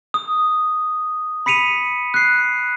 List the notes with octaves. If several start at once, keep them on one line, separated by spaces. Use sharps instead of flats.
D#6
B5 B6 C#7 D#7 F7
F#6 C7